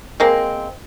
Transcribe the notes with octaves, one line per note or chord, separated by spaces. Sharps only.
G#3 A#3 C4